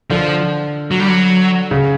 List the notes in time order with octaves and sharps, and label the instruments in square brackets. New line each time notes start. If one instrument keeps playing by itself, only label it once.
[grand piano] D3 [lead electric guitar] F3
[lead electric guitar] F#3
G3
F#3
[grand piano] C#3